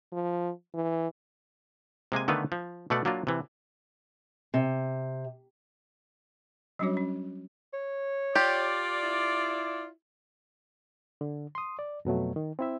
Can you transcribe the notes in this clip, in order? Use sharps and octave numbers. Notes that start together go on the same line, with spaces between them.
F3
E3
C3 G#3 A#3 G#5
D3 D#3 A3 B3 B4 F5
F3
B2 A3 D5 F#5
F#3 A#3 D4 F4
C3 E3
C3
F#3 G3 C#4 D4 F#4 C#5
C#4
C#5
F4 G4 D5
E4
D3
C6 D#6
D5
F2 B2 F#3 A3
D#3
C4 E4 E5